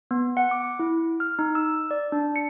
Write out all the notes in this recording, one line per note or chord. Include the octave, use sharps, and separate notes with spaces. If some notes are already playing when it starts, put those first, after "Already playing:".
B3
F#5
D6
E4
F6
D#4
E6
D5
D4
C#7